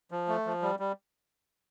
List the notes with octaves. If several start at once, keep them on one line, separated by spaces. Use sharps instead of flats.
F3
A3
F3
G3
G3